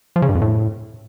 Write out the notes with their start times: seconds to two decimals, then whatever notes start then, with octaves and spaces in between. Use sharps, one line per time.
0.16 F3
0.22 C#3
0.29 G2
0.35 F2
0.42 A2